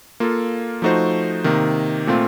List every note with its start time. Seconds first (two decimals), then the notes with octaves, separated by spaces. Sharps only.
0.20 A#3 F4 A4
0.82 F3 A3 D#4 F#4 C5
1.44 C3 D#3 A#3
2.07 A#2 A3 C4 F4